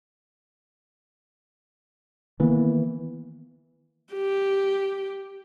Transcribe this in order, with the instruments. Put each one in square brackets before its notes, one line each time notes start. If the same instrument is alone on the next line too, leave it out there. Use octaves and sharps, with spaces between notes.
[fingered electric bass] D#3 A#3 B3 [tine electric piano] E3
[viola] G4